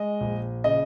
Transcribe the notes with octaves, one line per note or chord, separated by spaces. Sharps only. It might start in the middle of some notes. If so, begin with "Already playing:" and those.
Already playing: G#3 D#5
A#1
C#3 D#5